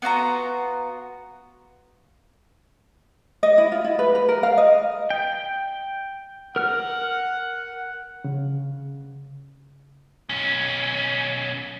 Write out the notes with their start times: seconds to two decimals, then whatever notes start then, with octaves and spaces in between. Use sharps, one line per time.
0.02 B3 F4 F#4 A#5
3.43 D#5
3.58 E4
3.72 F4
3.84 E4
3.99 B4
4.15 B4
4.29 A#4
4.43 F5
4.58 D#5
5.10 G5
6.56 A#4 F#5 F6
8.24 C#3
10.29 B1 C#4